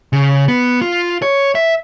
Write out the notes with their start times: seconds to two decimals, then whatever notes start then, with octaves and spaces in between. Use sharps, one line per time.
0.13 C#3
0.48 B3
0.82 F4
1.22 C#5
1.55 E5